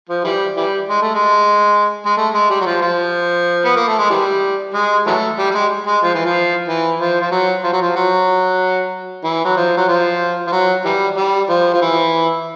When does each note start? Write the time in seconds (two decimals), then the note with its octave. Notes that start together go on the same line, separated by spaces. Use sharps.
0.09 F3
0.24 E3 G3
0.57 E3 G3
0.89 G#3
1.02 A3
1.15 G#3
2.06 G#3
2.17 A3
2.34 G#3
2.50 G3
2.61 F#3
2.66 F3
2.81 F3
3.65 B3
3.77 A#3
3.88 A3
3.99 G#3
4.10 E3 G3
4.75 G#3
5.06 E3 F#3 A3
5.39 G3
5.51 G3
5.55 G#3
5.87 G#3
6.03 F3
6.14 E3
6.25 F3
6.68 E3
7.00 F3
7.21 F3
7.31 F#3
7.63 F3
7.73 F#3
7.82 F3
7.96 F#3
9.24 E3
9.45 F#3
9.56 F3
9.77 F#3
9.88 F3
10.47 F3
10.52 F#3
10.85 E3 G3
11.17 G3
11.49 F3
11.74 F3
11.81 E3